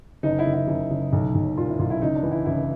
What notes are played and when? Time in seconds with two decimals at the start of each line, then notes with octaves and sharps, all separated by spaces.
0.23 F#1 D#4
0.39 E4
0.46 F#1
0.53 E4
0.68 F#1
0.91 F#1
1.13 B1
1.35 B1
1.57 A#2 F4
1.68 E4
1.79 B1 F4
1.90 E4
2.01 C#2 D#4
2.16 D4
2.23 E3
2.32 E4
2.46 C#2 E4